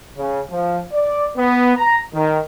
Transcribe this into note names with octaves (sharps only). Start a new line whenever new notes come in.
C#3
F3
D5
B3
A#5
D#3